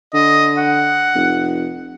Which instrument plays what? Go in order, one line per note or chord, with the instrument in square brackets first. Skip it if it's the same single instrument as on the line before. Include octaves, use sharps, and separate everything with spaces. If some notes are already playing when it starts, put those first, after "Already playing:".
[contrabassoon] D3 [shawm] D#5
[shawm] F#5
[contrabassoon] F1